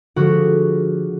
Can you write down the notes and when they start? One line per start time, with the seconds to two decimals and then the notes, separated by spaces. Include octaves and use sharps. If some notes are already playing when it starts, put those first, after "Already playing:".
0.16 D3 F3 G#3 F#4